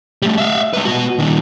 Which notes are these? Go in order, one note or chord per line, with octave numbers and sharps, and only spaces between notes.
G3 A3
E5 F5
G#3 B4
B3 F#4
A#2 D#3